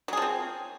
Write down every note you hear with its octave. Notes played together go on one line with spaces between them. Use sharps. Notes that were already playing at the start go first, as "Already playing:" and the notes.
F3 F#3 C4 G#4